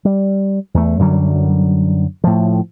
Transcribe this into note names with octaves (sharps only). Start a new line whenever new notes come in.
G3
E2 A3
F#2 D3 F#3 G3
A2 F3